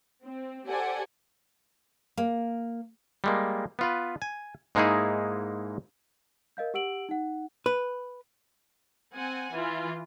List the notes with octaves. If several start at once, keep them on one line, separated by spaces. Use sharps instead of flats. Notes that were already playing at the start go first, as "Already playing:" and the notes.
C4
G4 A4 C5 D5 F#5 G#5
A#3
G3 G#3 A#3
B3 F4 B4
G#5
G#2 G#3 A#3 D#4 E4 G#4
A#4 D#5 F5 G6
G4 F#5 E6 D7 F#7
D#4 F#5
B4
C4 F#5 G#5
E3 F4